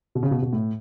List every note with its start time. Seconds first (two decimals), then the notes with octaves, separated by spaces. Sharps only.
0.15 B2
0.23 C#3
0.31 B2
0.42 B2
0.53 A2